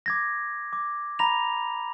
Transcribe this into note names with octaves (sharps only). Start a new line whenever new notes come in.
D6 G#6 A#6
D6
A#5 B5 A#6 F7